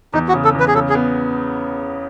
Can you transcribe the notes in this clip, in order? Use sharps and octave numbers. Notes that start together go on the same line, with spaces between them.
E2 D#4
F#4
C#3
A4
E2
B4
G#4
C#3 A4
G#4
B3